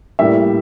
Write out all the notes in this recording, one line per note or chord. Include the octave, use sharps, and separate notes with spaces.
A2 G3 A#3 E5